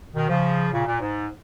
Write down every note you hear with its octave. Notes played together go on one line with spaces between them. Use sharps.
B2 D#3
C#3 F3
A#2 C#3
A#2
G#2